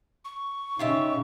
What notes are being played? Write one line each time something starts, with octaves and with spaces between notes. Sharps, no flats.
C#6
C#3 D#4 F4 G4 E5